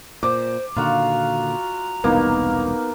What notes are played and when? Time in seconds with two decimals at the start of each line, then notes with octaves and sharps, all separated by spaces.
0.23 A#2 C5 D6
0.76 A#2 D3 D#3 F4 F#4 A#5
2.04 E1 C2 A#3 B3 D#4